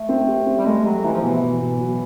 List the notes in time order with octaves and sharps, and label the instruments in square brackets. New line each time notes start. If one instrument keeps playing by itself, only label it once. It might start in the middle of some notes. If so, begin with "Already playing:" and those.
Already playing: [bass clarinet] A3
[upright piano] C4
G4
C4
[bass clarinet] G3
[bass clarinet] G#3 [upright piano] A3
[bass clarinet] F#3 [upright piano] G4
[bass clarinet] E3 [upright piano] E4
[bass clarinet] F3
[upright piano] B2 [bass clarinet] E3
[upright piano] B2
B2
F#3